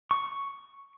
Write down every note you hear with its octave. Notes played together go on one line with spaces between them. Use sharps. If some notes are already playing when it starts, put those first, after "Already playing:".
C#6